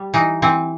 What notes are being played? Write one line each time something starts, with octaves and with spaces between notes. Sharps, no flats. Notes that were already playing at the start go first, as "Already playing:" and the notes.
Already playing: G3
E3 D#4
E3 C4